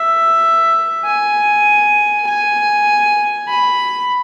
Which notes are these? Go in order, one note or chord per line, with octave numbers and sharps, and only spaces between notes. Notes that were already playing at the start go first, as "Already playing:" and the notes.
Already playing: E5
G#5
G#5
B5